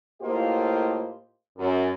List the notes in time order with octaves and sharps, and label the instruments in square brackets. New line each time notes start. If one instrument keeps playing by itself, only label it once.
[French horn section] A2 A#3 F4 G4 C5 D#5
F#2